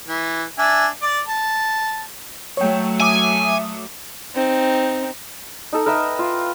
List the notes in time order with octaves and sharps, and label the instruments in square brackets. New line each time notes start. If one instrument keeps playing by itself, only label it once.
[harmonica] E3
D4 E5 G#5
D5
A5
[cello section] F#3 A3 [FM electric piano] C#5 G5
[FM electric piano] E5 D6 D#6 [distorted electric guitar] G#5
[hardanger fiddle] C4 D#4
[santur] D#4 A4
A#4 B4 E5 G5
F4